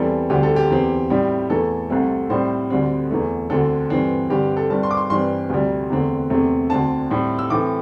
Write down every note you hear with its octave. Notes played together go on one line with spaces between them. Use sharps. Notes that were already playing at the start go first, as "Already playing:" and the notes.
Already playing: E2 E3 G3 C4 A4
D2 D3 G3 C4 G4
A4
G4
E2 E3 C4
A2 G3 C4
E2 E3 A3 A4
C2 C3 A3 C4
A2 G3 C4 C5
D2 D3 G3 C4
E2 E3 A3
D2 D3 C4 A4
G2 E3 C4
G2 D3 G3 C4 G4
A4
G2 G3 C4 A5
C6
D6
C6
G2 E3 G3 C4 C6
D2 C3 G3
E2 D3 A3 C4
E2 C3 A3 C4
D2 D3 C4 A5
A2 G3 C4
E6
A2 E3 A3 C4 D6